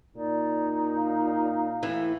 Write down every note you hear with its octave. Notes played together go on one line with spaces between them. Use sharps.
A#2 D#4 D5
F5
A2 E3